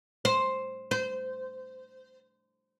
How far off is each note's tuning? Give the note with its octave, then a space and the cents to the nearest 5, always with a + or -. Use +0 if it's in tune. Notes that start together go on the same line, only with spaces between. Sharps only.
C5 +5
C5 -20